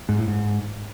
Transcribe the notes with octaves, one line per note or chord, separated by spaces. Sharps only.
G#2
A2
G#2